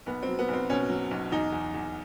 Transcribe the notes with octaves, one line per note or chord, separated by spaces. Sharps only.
B1 B3
C4
F#3
B3
B1 C4
B2 C#4
F#3
B1
E2 D#4
E2
E2